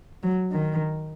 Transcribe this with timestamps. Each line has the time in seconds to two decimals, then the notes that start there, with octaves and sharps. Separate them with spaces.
0.23 F#3
0.52 D#3